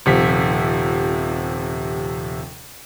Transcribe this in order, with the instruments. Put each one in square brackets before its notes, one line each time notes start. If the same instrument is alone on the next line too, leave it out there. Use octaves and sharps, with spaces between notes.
[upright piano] D#1 C3 F3 B6